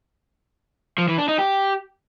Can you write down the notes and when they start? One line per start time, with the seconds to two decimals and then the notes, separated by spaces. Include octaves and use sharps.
0.98 F3
1.08 E3
1.18 D4
1.28 D#4
1.38 G4